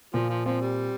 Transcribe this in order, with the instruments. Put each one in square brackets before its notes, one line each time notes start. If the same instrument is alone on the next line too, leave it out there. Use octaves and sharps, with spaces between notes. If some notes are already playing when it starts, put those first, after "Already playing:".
[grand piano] A#2 [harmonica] F3
[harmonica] F3
[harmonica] F3 [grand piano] C4
[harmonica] G3